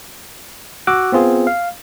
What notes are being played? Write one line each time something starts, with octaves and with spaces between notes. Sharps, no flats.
F#4 D6 E6 F#6
B3 C4 F4 G#4
F5